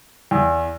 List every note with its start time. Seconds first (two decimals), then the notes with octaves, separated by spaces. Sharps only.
0.31 E2